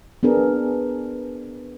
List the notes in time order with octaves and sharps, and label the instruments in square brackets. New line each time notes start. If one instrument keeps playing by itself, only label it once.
[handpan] B3 D4 G#4 A#4 B4